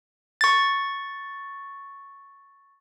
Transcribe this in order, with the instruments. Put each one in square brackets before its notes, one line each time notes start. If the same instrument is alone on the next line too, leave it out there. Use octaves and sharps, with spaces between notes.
[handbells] C#6 A6